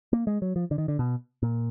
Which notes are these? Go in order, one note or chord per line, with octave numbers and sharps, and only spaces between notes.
A#3
G#3
F#3
F3
D3
D#3
D3
B2
A#2